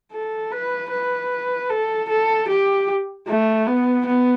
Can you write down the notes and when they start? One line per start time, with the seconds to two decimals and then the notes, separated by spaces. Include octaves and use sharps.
0.13 A4
0.52 B4
0.91 B4
1.70 A4
2.09 A4
2.48 G4
3.28 A3
3.67 B3
4.06 B3